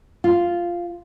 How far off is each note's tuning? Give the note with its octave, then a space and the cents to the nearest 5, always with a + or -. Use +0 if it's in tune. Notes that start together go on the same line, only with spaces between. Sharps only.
F4 -5